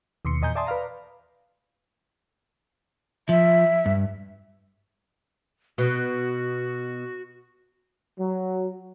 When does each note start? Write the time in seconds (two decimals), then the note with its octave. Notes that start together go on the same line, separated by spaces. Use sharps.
0.25 D#2 B2 C6 C#7
0.41 E2 A#2 D#5 G#5 A#5 G6
0.55 D5 E5 G#5 A5 C6 D#6
0.67 B4 D5 F5 A#5
3.29 F3 E5
3.86 G2
5.78 B2 F#4
8.19 F#3